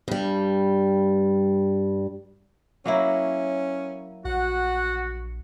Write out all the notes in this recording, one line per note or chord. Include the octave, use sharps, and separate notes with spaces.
G2 G3
F#3 A#3 C#4 E4
A#1 F#4 F#5